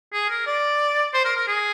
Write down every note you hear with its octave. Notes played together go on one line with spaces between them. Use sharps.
G#4
A#4
D5
C5
A#4
A#4
G#4